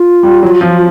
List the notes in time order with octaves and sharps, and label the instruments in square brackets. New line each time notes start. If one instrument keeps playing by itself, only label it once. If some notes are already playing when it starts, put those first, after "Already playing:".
Already playing: [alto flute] F4
[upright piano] G3
F#3
F3